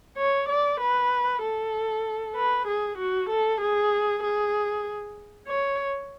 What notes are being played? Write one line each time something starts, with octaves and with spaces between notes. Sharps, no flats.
C#5
D5
B4
A4
B4
G#4
F#4
A4
G#4
G#4
C#5